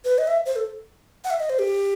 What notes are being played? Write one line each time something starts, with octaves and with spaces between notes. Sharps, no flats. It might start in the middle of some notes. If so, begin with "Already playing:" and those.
B4
D#5
E5
C5
A4
F#5
E5
D#5
C5
G4